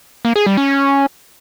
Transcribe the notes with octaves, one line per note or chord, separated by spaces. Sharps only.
A#3
G#4
G3
C#4